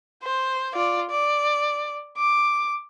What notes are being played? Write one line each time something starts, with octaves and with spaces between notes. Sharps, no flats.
C5
F4 D5
D5
D6